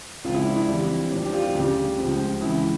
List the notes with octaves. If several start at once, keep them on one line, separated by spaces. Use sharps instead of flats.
C#2 C#3 F3 F4
E4
D4
E4
F2 E3 G3
A2 F3 D4
G4
F4
F4
D2 C#3 G3 G4
C#2 C#3 F3
C#2 C#3 E3 E4